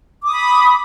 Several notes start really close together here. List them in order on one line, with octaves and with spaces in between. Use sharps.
D6 D#6 B5